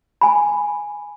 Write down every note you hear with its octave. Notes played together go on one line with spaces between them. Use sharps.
G#5 B5